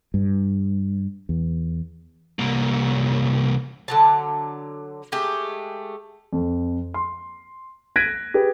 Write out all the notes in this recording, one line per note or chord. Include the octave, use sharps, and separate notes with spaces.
G2
E2
C2 A#3
D3 F#3 A5
G#3 A3 G4
F2
C6
F#6 G#6 A#6 B6 D7 D#7
G4 G#4 B4